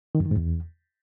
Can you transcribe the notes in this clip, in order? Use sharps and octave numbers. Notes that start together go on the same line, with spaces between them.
D#3
F#2
D#3
G#2
E2